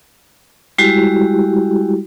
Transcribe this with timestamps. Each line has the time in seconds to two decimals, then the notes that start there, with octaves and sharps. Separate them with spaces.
0.78 G3 G#3 E4 F#4 G4